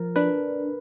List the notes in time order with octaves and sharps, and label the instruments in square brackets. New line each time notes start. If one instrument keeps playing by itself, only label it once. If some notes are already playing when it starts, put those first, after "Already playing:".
Already playing: [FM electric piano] F3 [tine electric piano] A#4
[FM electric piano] D4 [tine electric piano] B4